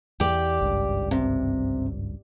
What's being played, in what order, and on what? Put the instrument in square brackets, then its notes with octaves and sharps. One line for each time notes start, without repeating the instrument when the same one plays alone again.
[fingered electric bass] E2 [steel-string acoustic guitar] G4 D5
[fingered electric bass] G#1 C#2 G2
[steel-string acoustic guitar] C3